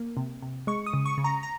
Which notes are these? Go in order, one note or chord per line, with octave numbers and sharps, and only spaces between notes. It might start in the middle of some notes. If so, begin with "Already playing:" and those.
Already playing: A#3
C3
C3
G#3 C#6
D#6
C#3
C#6
C#3
A#5
A#5